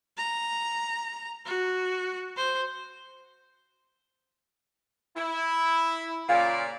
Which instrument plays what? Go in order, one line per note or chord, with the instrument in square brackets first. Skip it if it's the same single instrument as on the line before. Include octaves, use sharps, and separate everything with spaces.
[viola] A#5
F#4
C5
[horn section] E4
[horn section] A#2 C#3 D5 [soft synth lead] F5